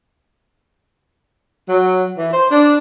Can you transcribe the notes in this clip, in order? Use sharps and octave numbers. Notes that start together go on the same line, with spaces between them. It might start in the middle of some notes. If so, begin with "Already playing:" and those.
F#3
E3
C5
D4